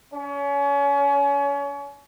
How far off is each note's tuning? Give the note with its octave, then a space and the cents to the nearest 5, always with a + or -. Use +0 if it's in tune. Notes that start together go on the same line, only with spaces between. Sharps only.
C#4 +30